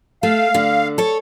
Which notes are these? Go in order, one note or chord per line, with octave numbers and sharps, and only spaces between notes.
A3 F5
D3
A4 C#5